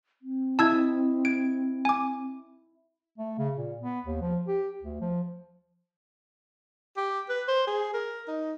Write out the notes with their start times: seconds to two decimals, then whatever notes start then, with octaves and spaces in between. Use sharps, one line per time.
0.22 C4
0.59 E4 D#5 E5 A5 E6 G#6
1.25 G#6 D7
1.85 G#5 D6
3.18 A3
3.38 C#3
3.56 A#2
3.81 B3
4.06 D#2
4.21 F3
4.47 G4
4.82 D2
5.01 F3
6.97 G4
7.30 B4
7.48 C5
7.67 G#4
7.93 A#4
8.28 D#4